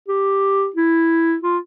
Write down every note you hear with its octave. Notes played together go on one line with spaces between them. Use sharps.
G4
E4
F4